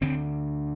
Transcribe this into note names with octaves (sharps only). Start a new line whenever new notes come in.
D2 D3 C4